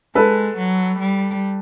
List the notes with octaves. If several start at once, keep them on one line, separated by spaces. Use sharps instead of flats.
G#3 A4 B4
F#3
G3